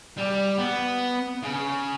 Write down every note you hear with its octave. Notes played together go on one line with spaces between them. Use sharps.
G3
B3
C#3